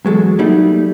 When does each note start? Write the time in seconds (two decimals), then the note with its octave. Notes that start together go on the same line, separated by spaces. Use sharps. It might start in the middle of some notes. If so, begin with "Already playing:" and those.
0.05 E2 F#3 G#3 A4
0.39 F#3 G3 A3 A#3 D#4